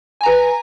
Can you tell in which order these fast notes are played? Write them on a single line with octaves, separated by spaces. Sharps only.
G#5 A#5 B4